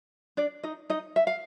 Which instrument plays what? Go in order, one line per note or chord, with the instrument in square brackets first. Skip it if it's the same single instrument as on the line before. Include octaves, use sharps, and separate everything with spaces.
[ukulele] D4 D5
D#4 D#5
D#4 D#5
E5
F5